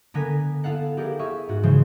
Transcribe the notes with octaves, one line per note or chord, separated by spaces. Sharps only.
D3 B3 A#4 G#5 B6
B3 E4 A4 F5 F#5
E4 G4 G#4 A#4 D5 F#5
G#4 E5 C#6 F6
G#2 F#4
C#3 E3 F3 G#3 F4 C5